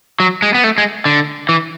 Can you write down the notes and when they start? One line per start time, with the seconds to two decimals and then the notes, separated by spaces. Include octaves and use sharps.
0.20 F#3
0.42 G#3
0.55 B3
0.64 A3
0.78 G#3
1.05 D3
1.49 E3